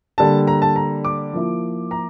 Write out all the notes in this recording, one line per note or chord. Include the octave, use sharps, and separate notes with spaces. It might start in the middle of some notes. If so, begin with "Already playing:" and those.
D3 G3 A#3 A5
A#5
A5
A#5
D6
F3 A#3 E4
A#5